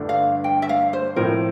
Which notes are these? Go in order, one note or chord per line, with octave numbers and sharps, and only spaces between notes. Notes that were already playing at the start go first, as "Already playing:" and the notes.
Already playing: G1 G2 D3 A3 D4
F5
G5
E5
F5
C5
A2 F3 C4 A#4